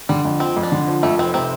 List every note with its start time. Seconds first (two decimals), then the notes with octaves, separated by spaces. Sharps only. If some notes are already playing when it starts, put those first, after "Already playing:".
0.09 D3 G3
0.25 F2
0.40 F3 C4
0.56 F2
0.63 D4
0.72 D3
0.88 F3
1.03 F2 A3
1.18 F1 C4
1.34 C3 C4